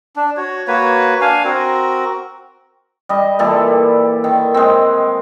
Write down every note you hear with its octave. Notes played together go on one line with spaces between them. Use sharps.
D4
F#4 C#5
A#3 F#4 B4 C#5
D4 F5 G#5
C4 F#4 A#4
G3 D#5
A#2 E3 G3 A4
D#3
G#3 C4